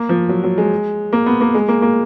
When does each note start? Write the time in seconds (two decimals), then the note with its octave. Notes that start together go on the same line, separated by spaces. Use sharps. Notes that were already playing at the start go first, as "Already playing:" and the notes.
Already playing: A#3
0.09 F3
0.29 F#3
0.43 F#3
0.58 G#3
1.13 A#3
1.26 B3
1.41 A#3
1.55 G#3
1.68 A#3
1.82 A#3